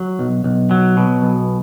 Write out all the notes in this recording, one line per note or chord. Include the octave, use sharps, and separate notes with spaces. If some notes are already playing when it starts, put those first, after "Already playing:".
Already playing: F#3
B1
B1
F#3
B2
B1